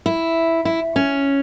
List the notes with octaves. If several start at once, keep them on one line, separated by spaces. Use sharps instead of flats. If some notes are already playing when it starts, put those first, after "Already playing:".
E4
E4
C#4